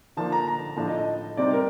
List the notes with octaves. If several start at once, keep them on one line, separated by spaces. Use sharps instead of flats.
D3 F3 A#3 D4 A5
A#5
A#5
A2 F3 A3 D4 A5
D#5
D#5
C3 G3 C4 D#4 D5
A#4